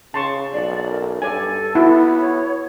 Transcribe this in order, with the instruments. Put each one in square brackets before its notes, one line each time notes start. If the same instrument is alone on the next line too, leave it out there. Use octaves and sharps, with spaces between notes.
[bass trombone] C#3 [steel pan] A5 C6 C#6
[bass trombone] B1 [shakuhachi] D5
[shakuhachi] A#4
[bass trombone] G2 [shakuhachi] A4 [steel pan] D5 G#5
[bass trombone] B3 [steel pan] E4 F#4
[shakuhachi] C#5